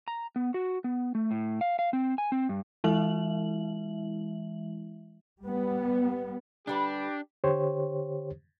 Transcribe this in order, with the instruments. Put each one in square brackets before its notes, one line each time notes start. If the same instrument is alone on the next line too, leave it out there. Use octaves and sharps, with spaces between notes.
[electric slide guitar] A#5
B3
F#4
B3
A3
A2
F5
F5
C4
G#5
C4
G2
[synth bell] E3 G#3 E4 E5 F#7
[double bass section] G3 B3
[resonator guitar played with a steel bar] D3 G3 B4 [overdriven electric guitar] D4 [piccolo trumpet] G4
[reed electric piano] D3 G4 C5 C#5